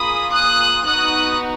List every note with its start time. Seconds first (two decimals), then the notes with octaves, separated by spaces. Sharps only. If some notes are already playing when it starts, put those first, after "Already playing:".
Already playing: A#3 F4 G#4 B5 D#6
0.31 D#6 F#6
0.85 B3 D#4 F#4 D#6 F#6